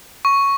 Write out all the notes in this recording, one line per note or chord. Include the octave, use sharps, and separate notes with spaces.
C#6